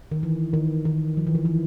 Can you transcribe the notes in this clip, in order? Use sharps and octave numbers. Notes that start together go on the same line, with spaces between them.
D#3
E3
D#3
D#3
F3
E3
D#3
E3